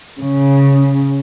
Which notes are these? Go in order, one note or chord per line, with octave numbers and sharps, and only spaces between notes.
C#3